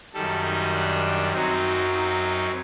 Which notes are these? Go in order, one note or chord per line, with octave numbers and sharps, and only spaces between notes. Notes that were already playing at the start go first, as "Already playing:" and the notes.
F#2 D#3 G3 A4
D#4
D4
F#2 F#3 C4 D#4
D#4